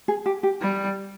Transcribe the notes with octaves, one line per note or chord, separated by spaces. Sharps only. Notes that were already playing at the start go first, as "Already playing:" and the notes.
G#4
G4
G4
G3